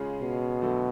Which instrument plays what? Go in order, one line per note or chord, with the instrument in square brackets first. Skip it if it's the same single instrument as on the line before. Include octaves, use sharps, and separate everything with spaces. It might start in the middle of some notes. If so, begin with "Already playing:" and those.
Already playing: [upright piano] C#3 G#3 C#4 F4 G#4
[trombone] B2
[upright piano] D3 F#3 A3